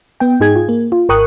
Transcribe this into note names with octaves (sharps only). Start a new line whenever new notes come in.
B3 G5
G#2 D#4 G#4 G#6
F4
A#3
F4
G#1 A#4 G5 C#6 D#6 F#6